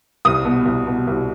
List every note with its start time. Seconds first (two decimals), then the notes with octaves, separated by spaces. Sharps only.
0.25 C2 D#6
0.45 B2
0.65 C2
0.87 B2
1.07 C2